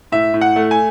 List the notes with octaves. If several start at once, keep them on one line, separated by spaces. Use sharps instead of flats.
A2 E5
A2
F#5
A3
G#5